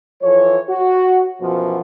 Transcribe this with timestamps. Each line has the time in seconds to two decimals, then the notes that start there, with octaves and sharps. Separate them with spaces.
0.22 E3 F3 A4 C#5
0.70 F#4
1.41 F#2 B2 E3 F3